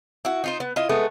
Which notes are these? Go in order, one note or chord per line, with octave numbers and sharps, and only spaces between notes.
E4 F#4
D#4 F4 C5
B3
E4 F4 D#5
G#3 A3 B3